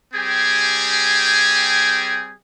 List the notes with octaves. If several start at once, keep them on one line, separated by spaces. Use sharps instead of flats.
G3 C4 G4 G#4 G#5